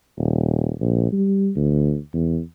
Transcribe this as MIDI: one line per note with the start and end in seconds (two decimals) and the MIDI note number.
0.18 0.72 27
0.80 1.10 34
1.12 1.50 55
1.56 1.97 38
2.13 2.40 40